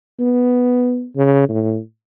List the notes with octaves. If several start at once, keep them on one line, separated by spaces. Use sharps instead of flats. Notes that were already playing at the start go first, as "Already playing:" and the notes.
B3
C#3
A2